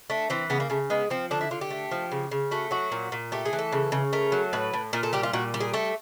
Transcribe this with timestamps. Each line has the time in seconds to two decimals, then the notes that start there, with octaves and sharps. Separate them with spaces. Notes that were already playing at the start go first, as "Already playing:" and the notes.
0.10 A3 D4
0.30 E3 C4
0.50 C#3 B3
0.60 A#3
0.70 C#3 A3
0.90 G#3 B3
1.10 F3 C4
1.31 D3 D4
1.41 E4
1.51 D3 F4
1.61 G4
1.70 A3
1.91 F3
2.12 C#3
2.31 C#3
2.51 A3 F#4
2.71 F#3 F#4
2.92 A#2
3.12 A#2
3.32 A3 G4
3.45 G#4
3.53 E3
3.59 A4
3.72 C#3
3.92 C#3
4.13 A3 A#4
4.32 F#3
4.53 A2 B4
4.73 A2
4.93 A#2 A#4
5.03 A4
5.13 G3 G4
5.23 F4
5.33 A#2 F#4
5.54 G3
5.60 G#4
5.73 A3 A4